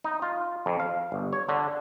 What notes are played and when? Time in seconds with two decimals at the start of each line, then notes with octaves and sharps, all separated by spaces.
0.04 D#4
0.22 F4
0.66 F2
0.80 F5
1.12 G1
1.33 C#5
1.49 D3